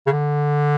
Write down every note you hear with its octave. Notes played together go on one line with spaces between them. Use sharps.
C#3
D3